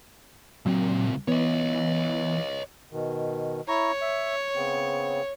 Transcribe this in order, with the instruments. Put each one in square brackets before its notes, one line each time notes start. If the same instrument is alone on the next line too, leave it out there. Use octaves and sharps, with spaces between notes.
[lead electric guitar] C#2 C4 [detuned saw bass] A#2 [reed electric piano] F#3
[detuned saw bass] E3 [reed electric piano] B3 [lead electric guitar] C#5 D#5
[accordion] B2 D#3
[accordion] E4 A#5 C#6 [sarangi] C#5
[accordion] E5
C#3 B3 C4